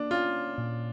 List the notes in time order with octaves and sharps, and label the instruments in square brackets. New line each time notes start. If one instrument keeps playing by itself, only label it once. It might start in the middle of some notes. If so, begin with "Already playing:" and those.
Already playing: [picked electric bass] A#3 [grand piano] D4
[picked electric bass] C#4 [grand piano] F4
[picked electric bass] A#2